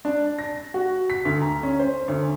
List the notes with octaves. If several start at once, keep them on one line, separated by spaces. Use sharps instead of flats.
D4
A#6
F#4
B6
D2
A#5
C#4
C5
D2